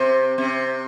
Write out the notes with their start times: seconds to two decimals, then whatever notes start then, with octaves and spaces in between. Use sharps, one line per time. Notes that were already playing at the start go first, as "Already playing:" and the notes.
Already playing: C3 C4
0.38 C3 C4